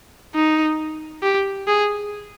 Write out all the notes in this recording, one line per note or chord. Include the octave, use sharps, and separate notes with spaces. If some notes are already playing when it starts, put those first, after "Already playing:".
D#4
G4
G#4